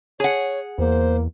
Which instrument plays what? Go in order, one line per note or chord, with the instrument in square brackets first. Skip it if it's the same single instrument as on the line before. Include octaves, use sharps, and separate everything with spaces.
[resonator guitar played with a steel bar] G#4 F#5 [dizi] C#5
[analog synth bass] E2 [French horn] A#3 [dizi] C5